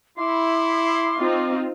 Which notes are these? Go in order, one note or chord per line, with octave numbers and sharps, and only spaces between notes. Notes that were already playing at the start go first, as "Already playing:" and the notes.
E4 C6 D6
C4 D#4 F4